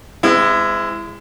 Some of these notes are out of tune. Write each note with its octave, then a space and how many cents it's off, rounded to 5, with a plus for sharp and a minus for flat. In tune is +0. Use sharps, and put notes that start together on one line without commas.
G#3 -25 C4 -45 E4 +15